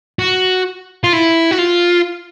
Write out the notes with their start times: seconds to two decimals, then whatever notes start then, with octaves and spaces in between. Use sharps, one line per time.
0.19 F#4
1.04 F4
1.13 E4
1.51 F#4
1.59 F4